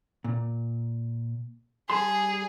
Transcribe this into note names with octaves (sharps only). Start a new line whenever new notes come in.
A#2
G3 G#4 A5 C6